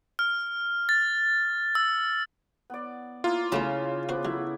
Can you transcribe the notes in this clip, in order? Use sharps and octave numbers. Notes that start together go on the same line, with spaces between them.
F6
A6
E6
B3 D5
A#3 E4 F4
C#3 F#3 A3 C#4 E4
B3 F#4 B4 C5 D6
F#3 A3 E4 E5